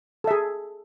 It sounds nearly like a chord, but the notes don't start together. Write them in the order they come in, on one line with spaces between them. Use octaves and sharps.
A4 E5 G#4